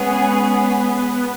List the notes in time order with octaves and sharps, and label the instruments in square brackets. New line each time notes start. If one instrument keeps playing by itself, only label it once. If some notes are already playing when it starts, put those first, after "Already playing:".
Already playing: [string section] G#3 C#4 G#4 [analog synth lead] B3